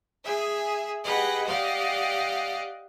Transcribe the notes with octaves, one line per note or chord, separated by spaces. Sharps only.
G#4 E5 G#5
G4 G#4 B4 D#5 F#5
G4 D5 D#5 F5 F#5